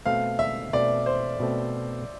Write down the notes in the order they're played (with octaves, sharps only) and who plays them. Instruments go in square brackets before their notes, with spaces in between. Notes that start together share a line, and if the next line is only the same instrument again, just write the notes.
[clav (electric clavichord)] B2 A3 C4 [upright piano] F5
[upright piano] E5
[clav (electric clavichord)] B2 A3 C4 [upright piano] D5
[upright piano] C5
[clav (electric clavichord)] B2 A3 C4